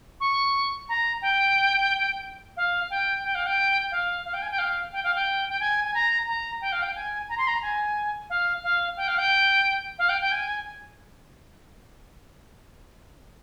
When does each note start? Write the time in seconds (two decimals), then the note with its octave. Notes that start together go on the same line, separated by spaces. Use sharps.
0.20 C#6
0.89 A#5
1.22 G5
2.57 F5
2.90 G5
3.24 G5
3.35 F5
3.47 G5
3.91 F5
4.25 F5
4.34 G5
4.42 G#5
4.51 G5
4.59 F5
4.92 G5
5.04 F5
5.15 G5
5.49 G5
5.60 G#5
5.84 G#5
5.94 A#5
6.28 A#5
6.61 G5
6.72 F5
6.82 G5
6.95 G#5
7.29 A#5
7.38 C6
7.47 A#5
7.62 G#5
8.30 F5
8.64 F5
8.97 G5
9.08 F5
9.18 G5
9.98 F5
10.09 G5
10.21 G5
10.32 G#5